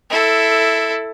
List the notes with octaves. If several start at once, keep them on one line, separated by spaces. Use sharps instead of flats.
E4 A4